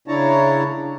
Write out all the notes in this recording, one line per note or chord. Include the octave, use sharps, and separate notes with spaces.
C#3 D4 E4 C#5 A5 A#5